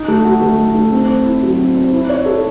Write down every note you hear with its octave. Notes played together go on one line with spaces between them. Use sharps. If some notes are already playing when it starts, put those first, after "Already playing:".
Already playing: D#4
A3
F#4
A3
D#4
A3
C4
C5
E4
F#3
C4
C5
E4
C#5
A4